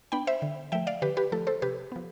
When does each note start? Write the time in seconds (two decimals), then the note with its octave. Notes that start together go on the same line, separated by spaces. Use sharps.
0.12 B3 D4 G5 B5
0.27 C5 E5
0.42 D3
0.72 F3 A3 E5 G5
0.87 D5 F5
1.02 D3 G4 B4
1.17 G4 B4
1.32 F3 A3 A4
1.47 A4 C5
1.62 C3 G4 B4
1.92 F3 B3